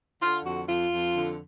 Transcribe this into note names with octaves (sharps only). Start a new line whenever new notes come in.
D3 F4
F2 F#4
F2 F4
F2
D3